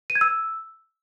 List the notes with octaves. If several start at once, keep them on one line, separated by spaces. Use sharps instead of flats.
D#7
G#6
E6